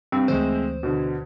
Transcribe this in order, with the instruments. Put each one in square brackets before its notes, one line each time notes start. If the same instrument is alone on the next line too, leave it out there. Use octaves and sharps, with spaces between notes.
[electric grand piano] G2 [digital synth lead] C4
[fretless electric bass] D2 C#3 E3 [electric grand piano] G#3 A3 C4 [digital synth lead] C5
[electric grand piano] B2 D3